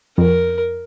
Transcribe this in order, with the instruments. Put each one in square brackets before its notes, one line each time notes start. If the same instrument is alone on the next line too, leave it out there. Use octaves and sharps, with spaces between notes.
[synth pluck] F2 [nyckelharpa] A#4